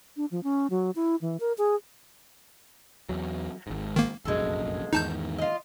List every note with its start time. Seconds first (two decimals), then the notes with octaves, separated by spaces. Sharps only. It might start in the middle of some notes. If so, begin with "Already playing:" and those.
0.17 D4
0.31 F3
0.43 C#4
0.70 F#3
0.96 E4
1.21 E3
1.40 A#4
1.58 G#4
3.09 E2 F#3
3.67 G#1 G#2
3.96 D#3 A#3
4.25 F1 A#1 F#2 G#3 A4
4.93 E2 G#2 D#3 D#4 A5 G6
5.38 F4 D#5